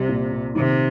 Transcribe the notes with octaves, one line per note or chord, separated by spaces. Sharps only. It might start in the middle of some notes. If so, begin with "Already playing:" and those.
Already playing: C2 C3 G3 C4
A#2
A#2
C3 D#3